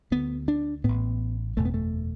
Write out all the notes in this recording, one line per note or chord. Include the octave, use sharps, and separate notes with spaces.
D2 D3 B3
D4
A1 A2 B3
F#1 E2 B2 A3
B3
A3